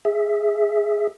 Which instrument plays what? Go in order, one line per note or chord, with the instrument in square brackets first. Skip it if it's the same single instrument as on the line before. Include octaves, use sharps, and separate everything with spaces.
[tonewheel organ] G#4 E5